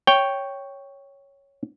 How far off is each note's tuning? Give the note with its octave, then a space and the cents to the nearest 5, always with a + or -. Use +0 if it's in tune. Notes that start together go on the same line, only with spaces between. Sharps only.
C#5 +0 G5 -5